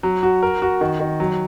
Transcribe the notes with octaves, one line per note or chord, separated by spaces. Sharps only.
F#3
F#4
A#4
F#4
D#3
D#3
F#3